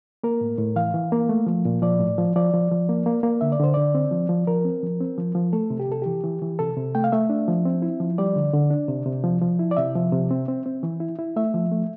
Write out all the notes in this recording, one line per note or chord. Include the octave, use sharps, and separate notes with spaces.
A#3 A#4
A2
A2
E3 F5
E3
A#3
A3
F3
A#2
F3 D5
A2
F3
F3 D5
F3
F3
A#3
A#3
A#3
D3 E5
D5
D3 C5
D3 D5
C4
F3
F3
F3 A#4
C4
F3
C4
F3
F3
A3 A4
C3
G4
C3 A4
E3 G4
E3
E3
C3 A4
C3
A3 G5
F5
A3 E5
D4
F3
C4
E4
F3
G3 D5
D3
D3
D4
C3
C3
F3
F3
E4
D5
C3 E5
F3
C3
C4
C4
C4
E3
E4
E4
A3 E5
F3
A3